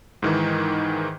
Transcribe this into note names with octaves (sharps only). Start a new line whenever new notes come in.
G#2 D#3 E3